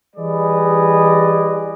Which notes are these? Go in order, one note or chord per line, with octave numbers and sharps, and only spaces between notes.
E3 G3 G#4 B4 D5 D#5